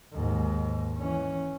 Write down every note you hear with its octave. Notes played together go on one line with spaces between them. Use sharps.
D#2 G#2
E3 C#4